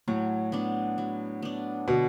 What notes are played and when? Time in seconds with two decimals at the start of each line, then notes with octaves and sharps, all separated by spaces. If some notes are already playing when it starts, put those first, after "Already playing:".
0.08 A2 F#3
0.52 B3 D4
0.98 F#3
1.42 B3 D4
1.88 B2 D3